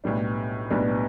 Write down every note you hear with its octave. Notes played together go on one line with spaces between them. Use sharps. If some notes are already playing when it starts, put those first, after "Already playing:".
B1 A2 G3 B3 D4
B1 A2 G3 B3 D4